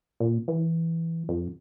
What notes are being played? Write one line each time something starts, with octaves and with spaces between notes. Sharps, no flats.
A#2
E3
F2